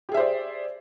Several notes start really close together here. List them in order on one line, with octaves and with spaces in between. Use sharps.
G4 G#4 E5 C5 D5